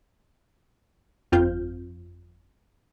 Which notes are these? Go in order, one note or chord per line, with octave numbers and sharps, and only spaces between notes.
G1 F2 C4 F4 F6 G6